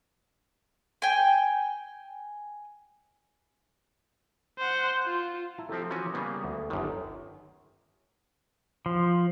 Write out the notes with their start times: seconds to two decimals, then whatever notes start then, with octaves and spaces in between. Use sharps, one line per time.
1.02 G5 G#5
4.58 C5 F#5
5.05 F4
5.58 E4 A5 A#5
5.69 F3 C4 G4 A4
5.90 E3 F3 C#4 F#4 G#5
6.14 C#3 G3 A#3 B3
6.44 D2
6.70 G1 F#2 D3 D#3
8.86 F3